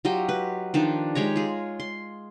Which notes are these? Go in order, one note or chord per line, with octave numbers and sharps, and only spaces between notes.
F#3 F4 G4 D#5
B4
D#3 F3 D4
G#3 G4 C#5 A#5
F4 G#4
C6